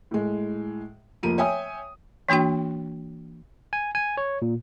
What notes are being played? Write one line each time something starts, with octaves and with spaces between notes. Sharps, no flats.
A2 G#3
F1 F3 A#3 D#7
C#5 E5 G5 G#5 D#6
E3 A#3 D4 F#4 G5
G#5
G#5
C#5
A#2